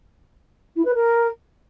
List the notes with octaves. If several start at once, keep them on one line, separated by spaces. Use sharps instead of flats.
E4
B4
A#4